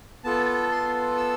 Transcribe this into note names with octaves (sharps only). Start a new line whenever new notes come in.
B3 F4 A4 A5
C6
E6